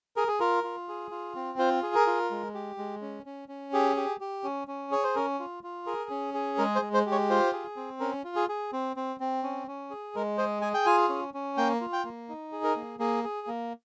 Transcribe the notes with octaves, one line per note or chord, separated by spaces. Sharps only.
G#4 A#4
G#4
F4 A#4
F4
G#4
F4
C4
F4 C5
G#4
A#4
F4
G#3
G4
G#3
C#4
C#4
C#4
G4 G#4
G4
G4
C#4
C#4
G#4 C#5
C5
C#4 A#4
F4
F4
G#4 A#4
C#4
G#4
G#3 A#4
C5
G#3
C5
G4
C#5
F4 C5
G#4
C4
C#4 A#4
F4
G#4
G#4
C4
C4
C4
C#4
C#4
G#4
G#3 A#4
G#4 C5
G#4 G#5
G5
F4 G#5
C#4
C#4
A#3 G5
F4
G5
A#3
D#4
G#4
A#4
A#3
A#3 G#4
G#4
A#3